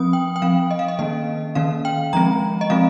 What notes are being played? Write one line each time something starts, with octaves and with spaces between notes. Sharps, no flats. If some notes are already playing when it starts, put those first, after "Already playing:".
Already playing: F3 C4 D#6
G5
G5
F3 C4 F5
D#5
F5
D#5
D#3 A#3 C#4 D#5
D#3 A#3 C#4 F5
G5
F3 G#3 C4 A#5
D#5
F3 G#3 C4 F5